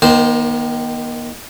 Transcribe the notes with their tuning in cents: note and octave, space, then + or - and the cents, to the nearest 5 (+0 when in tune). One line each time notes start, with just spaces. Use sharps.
D#3 +0 A#3 +45 C5 -5